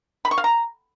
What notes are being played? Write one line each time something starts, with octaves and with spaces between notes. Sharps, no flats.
B5
C#6
F5
A#5